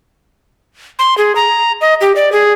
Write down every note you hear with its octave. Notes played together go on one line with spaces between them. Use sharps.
C6
G#4
A#5
D#5
G4
D5
G#4